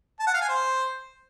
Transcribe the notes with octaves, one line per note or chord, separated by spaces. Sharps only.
A5
F#5
F5
G#5
C5